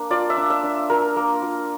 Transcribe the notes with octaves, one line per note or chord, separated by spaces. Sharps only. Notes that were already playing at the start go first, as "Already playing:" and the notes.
Already playing: A#3 D4
F4 D5
E5
D4
E5
D4
F4 A#4
A#3
F4